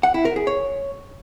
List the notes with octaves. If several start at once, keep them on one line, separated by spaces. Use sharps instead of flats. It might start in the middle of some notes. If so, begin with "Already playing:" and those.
F#5
E4
A#4
G#4
C#5